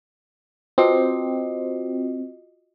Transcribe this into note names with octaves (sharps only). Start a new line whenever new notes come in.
C4 F4 F#4 D#5